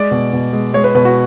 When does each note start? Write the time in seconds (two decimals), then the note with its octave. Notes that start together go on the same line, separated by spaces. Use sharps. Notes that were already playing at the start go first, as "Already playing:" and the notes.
Already playing: G#3 D5
0.11 B2
0.33 B2
0.53 G#3
0.74 G#3 C#5
0.84 B4
0.95 B2 B4
1.05 F#4